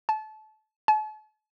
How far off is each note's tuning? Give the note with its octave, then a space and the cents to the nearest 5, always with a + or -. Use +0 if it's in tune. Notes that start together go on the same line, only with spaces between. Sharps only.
A5 -25
A5 -40